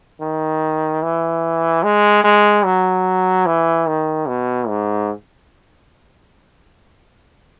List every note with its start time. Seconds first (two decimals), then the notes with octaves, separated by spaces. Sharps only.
0.21 D#3
1.03 E3
1.83 G#3
2.24 G#3
2.65 F#3
3.46 E3
3.87 D#3
4.28 B2
4.68 G#2